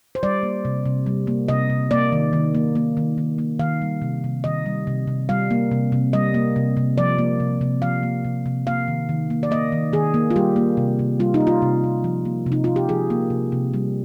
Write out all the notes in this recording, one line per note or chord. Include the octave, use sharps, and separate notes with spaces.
C5
G3 D5
A#3
C3
C3
G3
A#3
C3 D#5
C3
A#3 D5
D#3
D#3
A#3
A#3
D#3
D#3
A#3
D#3 F5
G3
C3
C3
D#3 D#5
G3
C3
C3
G3 F5
A#3
C3
C3
G3 D#5
A#3
C3
C3
F3 D5
A#3
C3
C3
F3 F5
A#3
C3
C3
A#3 F5
D#3
D#3
A#3
D5
A#3 D#5
D#3
D#3 G#4
A#3
F4
G3 G4
A#3
C3
C3
G3 F4
D#4
A#3
F4
C3
C3
F3
A#3
C3
D#4
C3 F4
G4
F3 G#4
A#3
C3
C3
G3